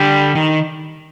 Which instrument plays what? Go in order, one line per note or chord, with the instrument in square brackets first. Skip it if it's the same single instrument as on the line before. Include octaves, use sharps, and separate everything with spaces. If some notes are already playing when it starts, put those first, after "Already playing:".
Already playing: [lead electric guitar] D3 [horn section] G3
[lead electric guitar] D#3